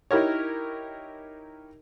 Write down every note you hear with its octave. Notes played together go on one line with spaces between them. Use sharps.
D#4 E4 G4 A#4 C#5